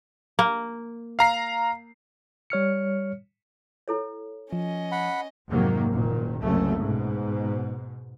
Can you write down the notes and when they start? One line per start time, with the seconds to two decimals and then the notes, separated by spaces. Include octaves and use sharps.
0.39 A#3
1.19 F5 A#5 C7
2.50 G3 C#5 F6 C#7
3.88 E4 A4 C#5
4.52 F3 C#4 D#5
4.92 F#5 B5
5.48 F1 G#2 D#3 F#3 A#3
5.91 F#1 A#2 D#3
6.42 F#1 C2 F#2 C#3 A3
6.80 G#2 B2